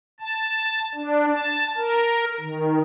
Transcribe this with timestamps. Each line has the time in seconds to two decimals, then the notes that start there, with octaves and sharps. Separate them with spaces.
0.20 A5
0.94 D4
1.31 A5
1.77 A#4
2.40 D#3